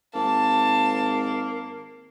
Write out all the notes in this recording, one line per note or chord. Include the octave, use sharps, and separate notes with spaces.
G#1 A#3 A5